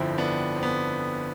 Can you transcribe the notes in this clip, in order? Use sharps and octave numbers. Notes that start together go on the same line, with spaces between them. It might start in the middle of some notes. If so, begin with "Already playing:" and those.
Already playing: G1 F2 D3 F3 C4 E4
B3 D4
C4
B3